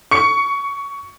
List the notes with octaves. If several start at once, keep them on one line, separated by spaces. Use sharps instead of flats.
C#6 C#7